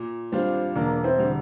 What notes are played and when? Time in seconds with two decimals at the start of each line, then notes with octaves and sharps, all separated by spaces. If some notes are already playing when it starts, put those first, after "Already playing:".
Already playing: A#2
0.32 G3 C4 D4 F4
0.75 E1 A#3 D4
1.04 C4 E4
1.18 D3 G3